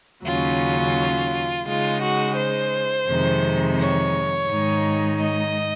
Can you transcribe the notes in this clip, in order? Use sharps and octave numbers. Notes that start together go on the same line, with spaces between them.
D#2 C#3 F#3 C#4 F4
C#3 G#3 D#4 F4
F#4
C5
F2 C3 D#3 G#3
C#5
G#2 D#3 G#3 D#4
D#5